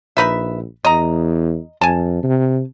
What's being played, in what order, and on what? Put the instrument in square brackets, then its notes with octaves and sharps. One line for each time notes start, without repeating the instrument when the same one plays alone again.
[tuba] A#1 [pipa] D#4 B4 E5
[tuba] E2 [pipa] D#5 A#5
[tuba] F2 [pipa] G#5 A5
[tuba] C3